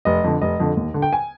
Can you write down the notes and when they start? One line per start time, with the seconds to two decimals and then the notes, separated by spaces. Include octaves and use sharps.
0.05 F1 D#5
0.24 F2 D3
0.41 F1 D#5
0.60 F2 D3
0.77 D#2
0.94 D3
1.02 G5
1.13 G#5